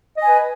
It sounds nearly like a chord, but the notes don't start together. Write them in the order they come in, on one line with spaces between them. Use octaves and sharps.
D#5 G#5 B4